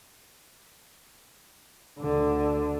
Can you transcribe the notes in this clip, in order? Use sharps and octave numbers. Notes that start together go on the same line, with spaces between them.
D2 D3